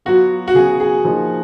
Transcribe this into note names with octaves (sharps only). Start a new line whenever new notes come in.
F#3 B3 F4 F#4
F#4
C#3 F#3 B3 G#4
G#4
F3 A#3 D#4